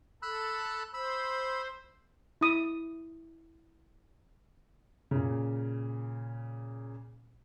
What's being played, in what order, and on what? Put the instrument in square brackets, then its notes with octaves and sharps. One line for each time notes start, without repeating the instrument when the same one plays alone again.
[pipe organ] A4 [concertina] B5 E6 F#6
[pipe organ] C5 [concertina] B5 E6
[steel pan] E4 D#6
[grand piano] A#2 C#3